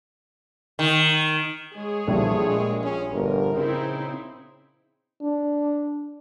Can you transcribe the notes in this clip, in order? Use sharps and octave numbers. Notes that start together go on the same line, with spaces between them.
D#3
G#3 G#4 C#5
A#1 E2 G3 A3
A#2 G#3
C#4
G1 A#4
C#3 C4 D#4 E4
D4